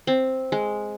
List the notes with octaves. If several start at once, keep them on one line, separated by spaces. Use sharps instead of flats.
C4
G#3